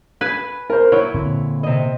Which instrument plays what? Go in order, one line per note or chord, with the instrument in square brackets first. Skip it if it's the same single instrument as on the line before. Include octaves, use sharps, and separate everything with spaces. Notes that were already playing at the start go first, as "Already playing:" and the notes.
[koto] B4 G#5
[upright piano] A#4 C5
[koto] F#3 [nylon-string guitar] E4 [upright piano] C#5
[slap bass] A#2 D3 C4
[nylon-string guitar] C3 D#5